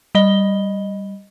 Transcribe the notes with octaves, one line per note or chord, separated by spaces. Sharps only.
G3 D#5 G7